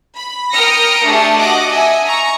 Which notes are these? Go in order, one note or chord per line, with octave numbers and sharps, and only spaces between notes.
B5
A#4 G5 D#6 F6 A#6 C#7
A3 D4 G4 G#4 A5
F#4 D#5 F#5 D6
D#5 E5 G#5
A#5 C#6